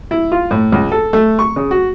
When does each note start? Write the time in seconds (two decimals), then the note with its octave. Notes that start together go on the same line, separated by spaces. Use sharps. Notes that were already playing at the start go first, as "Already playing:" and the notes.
0.11 E4
0.32 F4
0.51 A2
0.72 C#2
0.92 A4
1.13 A3
1.39 C#6
1.56 C#3
1.71 F#4